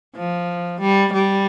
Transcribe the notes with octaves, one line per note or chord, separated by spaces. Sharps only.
F3
G3
G3